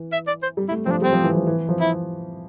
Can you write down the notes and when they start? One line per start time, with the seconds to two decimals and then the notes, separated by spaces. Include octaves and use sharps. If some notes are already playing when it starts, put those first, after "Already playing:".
Already playing: E3
0.12 E5
0.27 D5
0.42 C5
0.57 G3
0.68 E4
0.71 A3
0.85 F3 C4
0.91 D4
1.01 G3 C4
1.13 F3
1.23 E3
1.35 F3
1.47 E3
1.69 F3
1.80 E4